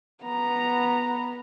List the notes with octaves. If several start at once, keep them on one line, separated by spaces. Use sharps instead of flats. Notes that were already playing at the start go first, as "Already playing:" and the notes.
B3 A#5